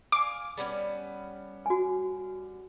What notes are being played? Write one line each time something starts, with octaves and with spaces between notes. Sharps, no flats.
F5 G#5 D6
G3 B3 C#4
F#4 G#5